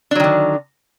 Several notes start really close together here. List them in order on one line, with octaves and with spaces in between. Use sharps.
D4 F#3 D#3 D3